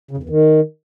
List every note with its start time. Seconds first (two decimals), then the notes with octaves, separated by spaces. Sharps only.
0.11 C#3
0.17 F2
0.23 E2
0.29 D#3